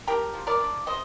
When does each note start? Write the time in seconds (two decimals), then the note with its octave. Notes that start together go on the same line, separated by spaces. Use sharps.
0.07 D4 G4 A#4
0.34 F3
0.47 A#4 D5
0.60 D4
0.86 C3 C5 D#5